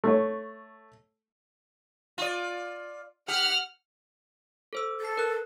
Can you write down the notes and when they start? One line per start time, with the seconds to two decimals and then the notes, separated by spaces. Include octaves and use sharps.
0.04 A3 C#5
2.18 F4 D5
3.28 G4 F#5 F6
4.73 A4 C5 E6
5.00 A4 A6 C7
5.17 A#4 B4 F#6